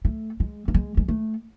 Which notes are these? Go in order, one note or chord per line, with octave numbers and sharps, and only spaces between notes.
A3
G#3
A3
G#3
G#3
A3